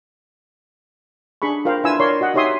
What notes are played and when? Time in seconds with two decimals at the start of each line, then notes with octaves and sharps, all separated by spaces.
1.42 D4 G#4 B5 C#6
1.65 F4 A#4 C5 F5 G5
1.84 D4 E4 F4 B4 G#5 E6
2.00 A#4 C#5 D5 C6
2.21 F#4 D#5 F#5
2.34 D#4 G4 C#5 E5 C6 D#6